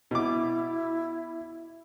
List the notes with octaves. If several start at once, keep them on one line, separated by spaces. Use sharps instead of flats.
B2 E4 D6